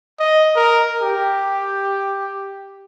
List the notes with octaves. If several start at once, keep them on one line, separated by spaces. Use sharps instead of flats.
D#5
A#4
G4